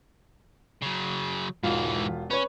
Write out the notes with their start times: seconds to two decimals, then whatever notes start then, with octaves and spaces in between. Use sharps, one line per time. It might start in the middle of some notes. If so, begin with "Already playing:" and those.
0.82 C#3 F#3
1.63 E1 G#2 E3 F4
2.31 C#4 B4 C#5